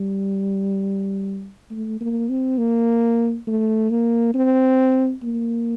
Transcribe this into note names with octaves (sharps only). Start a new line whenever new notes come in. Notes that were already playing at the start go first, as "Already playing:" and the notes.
Already playing: G3
A3
A#3
C4
A#3
A3
A#3
C4
A#3